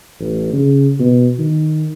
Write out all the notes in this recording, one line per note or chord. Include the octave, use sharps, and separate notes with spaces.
A1
C#3
B2
D#3